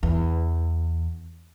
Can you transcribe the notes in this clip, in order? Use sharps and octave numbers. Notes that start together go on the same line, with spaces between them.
E2